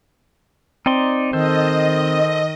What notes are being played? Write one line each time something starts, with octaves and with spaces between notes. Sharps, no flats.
C4 D#4 D5 C6
D#3 A4 C5 D#5